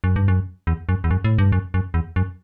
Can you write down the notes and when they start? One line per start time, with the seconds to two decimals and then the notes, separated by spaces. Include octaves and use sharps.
0.04 F#2
0.16 G2
0.28 F#2
0.67 E2
0.89 F#2
1.04 E2
1.11 F#2
1.24 A2
1.38 G2
1.52 F#2
1.74 F#2
1.94 E2
2.16 F#2